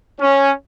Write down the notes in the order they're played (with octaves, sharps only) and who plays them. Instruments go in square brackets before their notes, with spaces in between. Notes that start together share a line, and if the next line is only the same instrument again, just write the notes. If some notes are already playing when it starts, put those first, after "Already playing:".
[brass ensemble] C#4